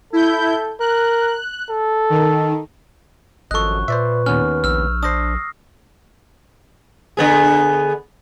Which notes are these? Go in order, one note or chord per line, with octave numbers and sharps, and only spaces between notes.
E4 A4 G6
A#4 F#6
A4
D#3
G#1 F#2 F3 A4 D#5 C#6 F#6
A#2 B4 C5 D5 E5
D#2 B3 C#4 F6
A#1 E6 F6
D4 C5 D#6 A#6 C7
D3 B3 G#4